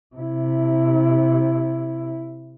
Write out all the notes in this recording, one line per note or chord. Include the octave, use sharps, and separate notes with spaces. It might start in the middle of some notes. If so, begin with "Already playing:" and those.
C3 E4